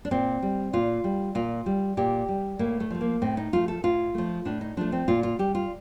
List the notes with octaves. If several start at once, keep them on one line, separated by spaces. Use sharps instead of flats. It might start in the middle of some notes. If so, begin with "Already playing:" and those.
D4
A#2 C4
G3
A#2 F4
G3
A#2 F4
G3
A#2 G4
G3
A2 A#3
A3
F3 A3
A#3
A2 C4
D#4
F3 A3 F4
A4
A2 F4
F3 A3
A2 D4
D#4
F3 A3 D4
C4
A#2 F4
F4
G3 G4
F4